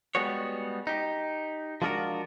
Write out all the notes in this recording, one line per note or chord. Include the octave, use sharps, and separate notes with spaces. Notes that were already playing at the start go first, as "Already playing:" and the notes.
G3 G#3 B3 F#4 C#5
D#4 G4
F3 G#3 D4 F4 F#4 A#4